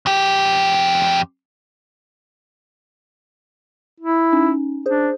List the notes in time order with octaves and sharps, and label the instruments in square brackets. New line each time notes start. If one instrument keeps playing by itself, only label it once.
[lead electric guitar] F2 G4
[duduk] E4
[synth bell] C#4 D#4
[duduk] D4 [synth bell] G#4 C5